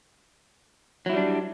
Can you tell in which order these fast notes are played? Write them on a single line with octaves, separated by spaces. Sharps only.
F#3 E4 G3 D4